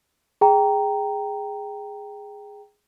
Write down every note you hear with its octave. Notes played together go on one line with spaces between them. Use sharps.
G#4 G5 A#5